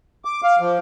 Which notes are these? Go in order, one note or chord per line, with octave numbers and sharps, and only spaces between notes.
D6
F5
F3